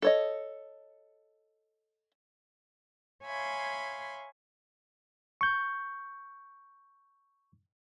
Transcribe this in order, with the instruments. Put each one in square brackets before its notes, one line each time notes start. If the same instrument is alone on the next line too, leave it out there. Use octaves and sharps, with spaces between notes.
[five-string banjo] A4 C#5 D#5
[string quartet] C#5 E5 F5 G#5 B5 C6
[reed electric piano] C#6 G6